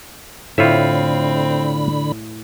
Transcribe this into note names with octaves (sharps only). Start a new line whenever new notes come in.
A2 D3 C4 F4 C#5 E5 B5